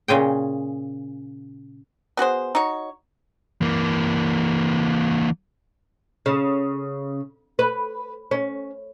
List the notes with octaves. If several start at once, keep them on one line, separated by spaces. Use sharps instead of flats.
A#2 C#3 G#4 G5
B3 F#4 G#4 C5
D#4 F#4 C#5
E3 A#3
C#3
B4
C#4